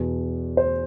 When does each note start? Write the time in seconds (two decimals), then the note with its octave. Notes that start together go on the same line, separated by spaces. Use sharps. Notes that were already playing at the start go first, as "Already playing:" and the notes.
Already playing: E2 B2
0.57 C5